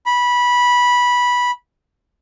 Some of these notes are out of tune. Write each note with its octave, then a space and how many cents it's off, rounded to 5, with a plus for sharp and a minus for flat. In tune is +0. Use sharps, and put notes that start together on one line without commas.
B5 -15